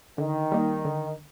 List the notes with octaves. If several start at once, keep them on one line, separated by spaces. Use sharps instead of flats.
D3 D#3
G3 A#3 D#4
D3